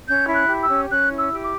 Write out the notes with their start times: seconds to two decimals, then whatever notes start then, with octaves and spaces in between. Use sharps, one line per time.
0.07 C#4 G6
0.27 E4
0.34 F#6
0.48 G4
0.61 E6
0.69 C#4
0.90 C#4 F#6
1.09 E4
1.17 E6
1.31 G4
1.43 D6